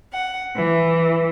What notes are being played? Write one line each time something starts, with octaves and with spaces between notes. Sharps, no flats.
F#5
E3